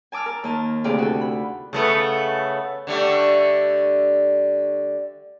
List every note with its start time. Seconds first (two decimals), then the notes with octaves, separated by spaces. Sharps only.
0.12 G#5 A5 D6 E6 F6
0.26 A#4 A5
0.44 D#2 D#5 A5
0.84 D2 C3 E4 G#4 D5 F5
0.98 F#4 A4
1.21 B5
1.73 C#3 A3 B3
2.87 D3 G3 A3